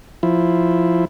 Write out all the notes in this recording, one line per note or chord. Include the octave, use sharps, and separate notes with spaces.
F3 E4